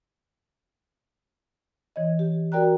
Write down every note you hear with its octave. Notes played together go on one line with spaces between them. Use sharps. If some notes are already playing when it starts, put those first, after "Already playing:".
E3 C#5 D#5
G4
F#4 A#4 D5 G5 A#5 F#6